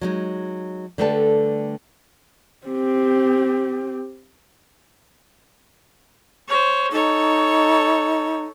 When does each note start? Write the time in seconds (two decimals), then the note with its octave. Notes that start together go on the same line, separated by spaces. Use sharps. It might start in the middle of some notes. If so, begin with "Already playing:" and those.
0.01 F#3 G#3 D#4
0.98 D3 G3 A3 A4 B4 A5
2.67 C4 G4
6.48 C5 C#5
6.92 D#4 A4 C#5